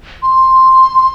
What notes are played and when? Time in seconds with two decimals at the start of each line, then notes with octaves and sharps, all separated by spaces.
0.22 C6